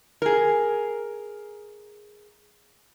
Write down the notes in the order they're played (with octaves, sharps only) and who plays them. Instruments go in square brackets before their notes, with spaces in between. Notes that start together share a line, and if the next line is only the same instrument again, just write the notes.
[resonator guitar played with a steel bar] G#4 A#4